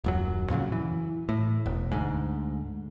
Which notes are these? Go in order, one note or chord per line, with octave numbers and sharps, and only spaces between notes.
D#1 F#2 F#3
F2 A#2 C#3 F#3
E3
A2
E1
D2 G#2